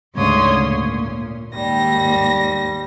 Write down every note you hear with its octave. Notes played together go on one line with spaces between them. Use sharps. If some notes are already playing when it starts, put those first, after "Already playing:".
D2 G#2 C#3 C#5 C6 D#6
A#2
D#2 G#2 G3 A#6